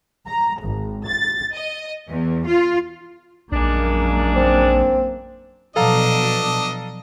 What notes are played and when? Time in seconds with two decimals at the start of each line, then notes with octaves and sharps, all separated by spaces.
0.25 A#5
0.60 G#1
1.05 A6
1.54 D#5
2.09 E2
2.47 F4
3.52 A#1 F#2 D#3 G#3 A#3 D4
4.36 C4
5.76 B2 F3 F#3 D4 A4 D#5 F5 A#5